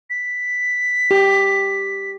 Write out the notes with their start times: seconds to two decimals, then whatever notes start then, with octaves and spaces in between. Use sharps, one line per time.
0.10 B6
1.11 G4